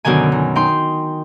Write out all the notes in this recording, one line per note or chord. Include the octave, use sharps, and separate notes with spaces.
F#2 B2 D3 D#3 G#5
D#3
D#4 G5 C6